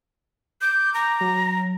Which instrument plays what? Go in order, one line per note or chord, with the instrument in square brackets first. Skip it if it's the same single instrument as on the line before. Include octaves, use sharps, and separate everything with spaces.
[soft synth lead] D6 [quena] G6
[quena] A#5
[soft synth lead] F#3